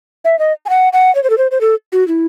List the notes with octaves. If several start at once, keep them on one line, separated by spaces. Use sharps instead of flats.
E5
D#5
G#5
F#5
F#5
C#5
C5
A4
C5
C5
A4
F#4
E4